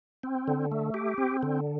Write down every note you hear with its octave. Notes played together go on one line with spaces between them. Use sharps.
C4
D3
A3
G4
C4
D3